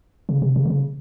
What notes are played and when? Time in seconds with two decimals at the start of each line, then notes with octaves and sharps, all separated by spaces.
0.29 C#3
0.42 C3
0.56 C#3
0.65 D3
0.70 C#3